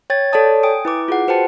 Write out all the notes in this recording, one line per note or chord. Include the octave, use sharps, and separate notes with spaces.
C#5 G5 G#6 A6
A4 C#5 D5 A5 D#6
G5 G#5 D#6 D7
E4 B4 D6
F4 G#4 F#5
F#4 B4 C5 G5 A5 C#7